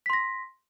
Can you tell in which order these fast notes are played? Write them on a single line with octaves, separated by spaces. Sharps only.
B6 C6 A#6